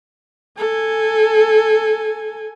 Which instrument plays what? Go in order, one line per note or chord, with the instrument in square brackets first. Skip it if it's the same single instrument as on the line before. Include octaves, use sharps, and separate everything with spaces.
[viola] A4 G#5